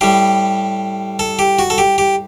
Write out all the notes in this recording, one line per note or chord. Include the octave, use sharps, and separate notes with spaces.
A2 G3 G4
A4
G4
F#4
A4
G4
G4